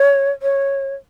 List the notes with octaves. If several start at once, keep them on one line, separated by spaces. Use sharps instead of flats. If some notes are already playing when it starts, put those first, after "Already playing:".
Already playing: C#5
C#5